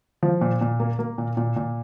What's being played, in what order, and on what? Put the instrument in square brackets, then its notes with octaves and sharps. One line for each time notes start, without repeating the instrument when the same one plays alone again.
[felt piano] F3
A#2
A#2
A#3
A#3
A#2
A#2
A#2